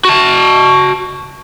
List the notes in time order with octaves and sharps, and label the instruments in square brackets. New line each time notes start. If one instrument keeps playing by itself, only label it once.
[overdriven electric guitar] F#4 A5